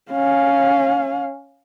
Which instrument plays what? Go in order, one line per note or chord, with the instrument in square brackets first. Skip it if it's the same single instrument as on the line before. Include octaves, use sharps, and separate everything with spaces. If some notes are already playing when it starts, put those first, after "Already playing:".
[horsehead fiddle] C#4 F5